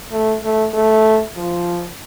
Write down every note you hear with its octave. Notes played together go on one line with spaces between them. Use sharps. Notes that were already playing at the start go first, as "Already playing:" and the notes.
A3
A3
A3
F3